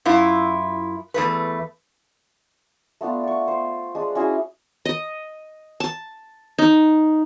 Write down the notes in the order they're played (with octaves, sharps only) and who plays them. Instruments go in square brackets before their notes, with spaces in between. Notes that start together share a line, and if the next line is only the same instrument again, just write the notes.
[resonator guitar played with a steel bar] F#2 E4 F4
E2 A3 B4
[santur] A3 B3 D4 F4
D5 C#6
C5
G#3 D4
C#4 E4 F#4 G#4
[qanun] D#5
A5
D#4